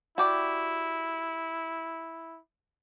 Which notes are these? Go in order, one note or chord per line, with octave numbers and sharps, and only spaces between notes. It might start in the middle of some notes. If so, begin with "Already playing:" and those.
E4 F#4 G4 D5